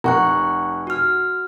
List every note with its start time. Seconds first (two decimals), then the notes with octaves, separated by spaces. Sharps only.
0.04 F1 F#5 A#5 C#6 F#6
0.87 F#4 F6